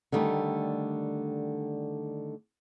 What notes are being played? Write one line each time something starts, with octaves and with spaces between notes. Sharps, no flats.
D3 D#3 G3 A3